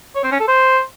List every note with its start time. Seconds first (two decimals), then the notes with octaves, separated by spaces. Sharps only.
0.15 C#5
0.23 C4
0.31 C#4
0.39 A4
0.48 C5